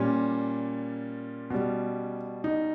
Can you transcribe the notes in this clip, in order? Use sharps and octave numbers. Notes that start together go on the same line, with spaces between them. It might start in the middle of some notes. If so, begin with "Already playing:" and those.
Already playing: A#2 G3 C#4
B2 G3
D#4